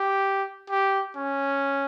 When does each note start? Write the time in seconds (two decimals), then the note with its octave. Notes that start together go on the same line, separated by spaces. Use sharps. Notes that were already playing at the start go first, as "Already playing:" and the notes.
Already playing: G4
0.71 G4
1.16 C#4